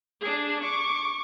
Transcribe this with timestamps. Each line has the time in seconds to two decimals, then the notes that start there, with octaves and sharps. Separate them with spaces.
0.21 D4 G#4
0.62 C#6 D6